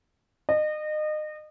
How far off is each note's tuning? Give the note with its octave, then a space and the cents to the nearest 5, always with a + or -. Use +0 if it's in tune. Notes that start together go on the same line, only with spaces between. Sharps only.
D#5 -30